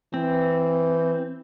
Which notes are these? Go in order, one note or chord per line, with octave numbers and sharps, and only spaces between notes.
E3 C4